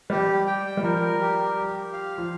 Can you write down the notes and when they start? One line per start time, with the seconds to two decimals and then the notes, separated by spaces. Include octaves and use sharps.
0.10 G3 G4
0.47 G5
0.77 G3
0.83 F3 A#4
1.21 G4
1.57 G4
1.93 F5
2.18 F3